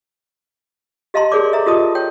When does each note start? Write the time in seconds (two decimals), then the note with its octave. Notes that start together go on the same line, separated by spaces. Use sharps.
1.14 G4 D#5 F5 A5 A#5 C6
1.32 G4 G#4 A#4 C#5 D5 D6
1.52 A4 B4 E5 A#5
1.66 F4 G4 A#4 D#5 A5 D#6
1.95 C#5 G5